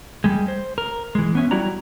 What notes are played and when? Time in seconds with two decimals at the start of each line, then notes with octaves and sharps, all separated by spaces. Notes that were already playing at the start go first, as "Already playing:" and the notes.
0.24 G3 G#3
0.48 C5
0.78 A#4
1.15 E3 G#3
1.35 B3 C#4 E5
1.51 F#3 G3 E4 F#4 D5 A#5